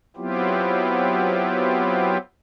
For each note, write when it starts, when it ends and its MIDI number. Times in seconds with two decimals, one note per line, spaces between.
0.16 2.17 54
0.16 2.17 59
0.16 2.17 60
0.16 2.17 64
0.16 2.17 65
0.16 2.17 67